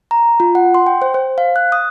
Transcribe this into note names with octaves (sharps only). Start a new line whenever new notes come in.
A#5
F4
F#5
C6
G5
C5
C5
F5
F#6
D#6